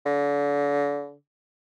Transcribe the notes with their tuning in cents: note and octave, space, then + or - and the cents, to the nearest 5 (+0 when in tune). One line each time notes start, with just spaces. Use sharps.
D3 -35